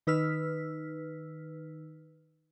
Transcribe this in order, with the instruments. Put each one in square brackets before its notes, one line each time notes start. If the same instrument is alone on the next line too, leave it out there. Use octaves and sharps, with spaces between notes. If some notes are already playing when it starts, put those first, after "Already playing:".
[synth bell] D#3 D#4 B4 E6 F6 B6